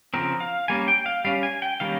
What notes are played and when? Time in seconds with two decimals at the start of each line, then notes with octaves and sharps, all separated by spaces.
0.14 C#3 F3 C4 A#4
0.40 F5
0.68 G3 A#3 C#4 G#5
0.88 G5
1.06 F5
1.25 G3 C#4 F5
1.43 G#5
1.62 G5
1.80 D#3 G3 A#3 C#4 F5